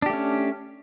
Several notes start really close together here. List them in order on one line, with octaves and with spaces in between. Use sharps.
D4 G4 A3 C#4